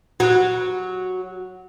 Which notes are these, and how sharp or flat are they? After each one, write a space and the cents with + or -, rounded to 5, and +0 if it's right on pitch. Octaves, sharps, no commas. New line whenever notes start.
F#3 -5